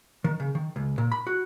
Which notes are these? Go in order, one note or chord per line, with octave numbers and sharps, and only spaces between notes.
D#3
C#3
D#3
C#2
A#2
B5
F#4